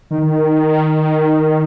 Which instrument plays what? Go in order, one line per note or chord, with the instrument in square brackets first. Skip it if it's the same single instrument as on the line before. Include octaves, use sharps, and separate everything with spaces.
[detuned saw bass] D#3